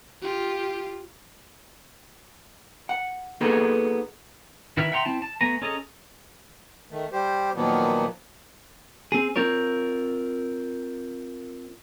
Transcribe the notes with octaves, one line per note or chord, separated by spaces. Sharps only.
F4 G4
F#5
A#3 B3 D#4 F#4 G#4 A4
D#3 E4 B4 E5 F6
E5 F#5 G5 A#5 C6
C4 E4 A5
A5
A3 B3 G#5 A#5
C#4 G#4 A4 D#5 A#5
D#3 A3
G3 G4 C5
A#2 D#3 F3 F#3 A#3 B3
C4 G#4
C4 F4 A#4 C#5